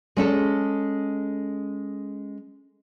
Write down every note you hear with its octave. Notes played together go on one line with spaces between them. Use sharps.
G#3 C#4 A4